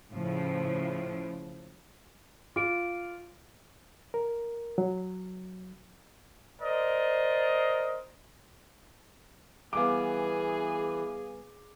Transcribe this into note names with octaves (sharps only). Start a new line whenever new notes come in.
A2 C#3 F3
F4 D6 D7
A#4
F#3
A#4 C5 D5 D#5
E3 G3 B3 G#4 F5 D6